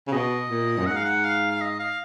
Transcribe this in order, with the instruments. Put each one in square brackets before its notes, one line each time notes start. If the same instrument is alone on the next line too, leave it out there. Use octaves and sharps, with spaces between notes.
[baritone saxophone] C#3
[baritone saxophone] B2 [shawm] D#5
[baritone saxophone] A#2
F#2
[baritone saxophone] G#2 [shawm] F#5
[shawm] F5
F#5
F5
F5
D#5
F5